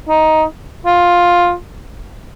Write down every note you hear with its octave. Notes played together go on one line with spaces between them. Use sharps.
D#4
F4